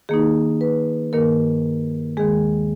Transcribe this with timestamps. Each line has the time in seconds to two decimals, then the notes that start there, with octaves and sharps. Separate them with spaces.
0.09 D#3 A#3 D#4 G#4
0.61 B4
1.13 G2 D#3 A#3 A#4
2.17 D#2 D#3 G#3 G#4